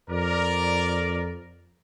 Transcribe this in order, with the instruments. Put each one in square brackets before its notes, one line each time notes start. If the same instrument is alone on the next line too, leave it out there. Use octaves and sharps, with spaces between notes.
[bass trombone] F2 [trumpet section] A#4 D5